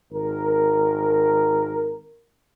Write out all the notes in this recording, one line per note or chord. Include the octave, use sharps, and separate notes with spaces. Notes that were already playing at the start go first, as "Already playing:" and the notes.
G#1 A#4